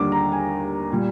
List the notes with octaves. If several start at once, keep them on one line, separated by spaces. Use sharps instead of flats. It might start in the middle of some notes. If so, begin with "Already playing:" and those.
Already playing: D#2 D3 G3 D6
A#5
G#5
A#2 G3